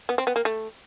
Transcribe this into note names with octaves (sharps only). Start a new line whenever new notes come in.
B3
C4
B3
A#3
A3